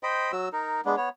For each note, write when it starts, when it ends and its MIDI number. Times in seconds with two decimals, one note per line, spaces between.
0.03 0.32 72
0.03 0.32 75
0.03 0.32 79
0.03 0.32 83
0.32 0.49 54
0.32 0.49 66
0.32 0.49 88
0.53 0.81 63
0.53 0.81 70
0.85 0.96 56
0.85 0.96 59
0.85 0.96 62
0.97 1.09 59
0.97 1.09 73